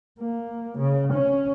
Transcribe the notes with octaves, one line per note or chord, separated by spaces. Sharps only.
A#3
C#3
C#4